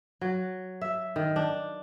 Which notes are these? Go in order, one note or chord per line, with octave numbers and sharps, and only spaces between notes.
F#3
E5
D#3
D4